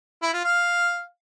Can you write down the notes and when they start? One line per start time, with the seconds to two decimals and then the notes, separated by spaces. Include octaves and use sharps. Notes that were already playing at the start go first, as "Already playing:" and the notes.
0.22 E4
0.33 F4
0.45 F5